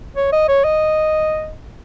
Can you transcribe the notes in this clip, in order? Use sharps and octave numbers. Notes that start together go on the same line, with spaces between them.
C#5
D#5
C#5
D#5